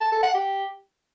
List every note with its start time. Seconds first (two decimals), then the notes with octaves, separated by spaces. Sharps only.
0.01 A5
0.12 A4
0.23 F#5
0.34 G4